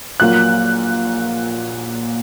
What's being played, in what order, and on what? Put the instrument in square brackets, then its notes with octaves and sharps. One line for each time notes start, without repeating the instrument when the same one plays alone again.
[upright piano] A#1 A#2 F#3 A#3 F#6